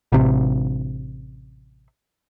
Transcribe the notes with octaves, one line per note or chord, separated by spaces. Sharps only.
A1 C3